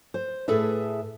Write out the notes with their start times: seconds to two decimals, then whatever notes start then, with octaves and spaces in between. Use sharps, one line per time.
0.14 C5
0.48 A2 G#4 A4 B4 E5